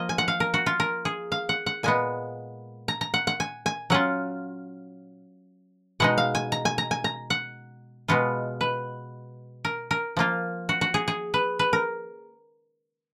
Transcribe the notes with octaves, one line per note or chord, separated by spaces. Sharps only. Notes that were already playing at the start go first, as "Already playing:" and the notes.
Already playing: F3 A#3 F4 D#5
G#5
F#5
F5
A#4
F#4
F4
A#4
G#4
F5
F#5
F#5
A#2 G#3 B3 G#5
A#5
A#5
F#5
F#5
G#5
G#5
F#3 C#4 F4 F#5
B2 G#3 D#4 F#5
F5
G#5
A#5
G#5
A#5
G#5
A#5
F#5
B2 G#3 B3 F4
B4
A#4
A#4
F3 A#3 F4
F#4
F#4
G#4
G#4
B4
B4
A#4